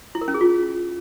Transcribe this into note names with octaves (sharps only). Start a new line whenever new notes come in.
E4
A#4
C#4
G#4
F4